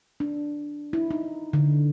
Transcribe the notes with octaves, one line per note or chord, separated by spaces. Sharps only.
D4
E4
D#4
D3